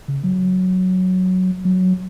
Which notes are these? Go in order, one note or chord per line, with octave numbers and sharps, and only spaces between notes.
C#3
F#3
F#3